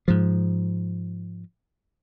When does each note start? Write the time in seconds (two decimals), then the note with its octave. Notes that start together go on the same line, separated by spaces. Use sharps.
0.08 G#2 F3